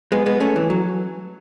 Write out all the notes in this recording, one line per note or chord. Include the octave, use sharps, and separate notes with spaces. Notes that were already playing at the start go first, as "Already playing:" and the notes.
G#3 B3
G#3 B3
A3 C#4
E3
F#3